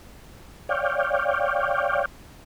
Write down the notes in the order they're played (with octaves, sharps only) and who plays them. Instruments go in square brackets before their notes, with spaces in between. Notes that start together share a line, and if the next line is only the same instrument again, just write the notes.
[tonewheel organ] C#5 D5 F5 G5